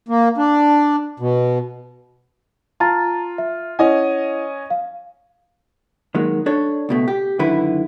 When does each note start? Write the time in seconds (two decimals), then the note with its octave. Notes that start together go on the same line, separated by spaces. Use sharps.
0.09 A#3
0.38 D4
1.20 B2
2.80 F4 A5 A#5 A6
3.38 E5
3.79 C#4 E4 D#5 F#5 G#5
4.70 F5
6.15 D#3 F#3 G#3 A#3
6.46 D4 A4 C#5
6.89 C#2 B2 A3
7.08 G4
7.39 F#2 D3 D#3 E4 B4